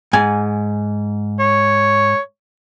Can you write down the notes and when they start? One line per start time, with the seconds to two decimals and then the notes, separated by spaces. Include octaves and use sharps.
0.13 G#2 G#5
1.39 C#5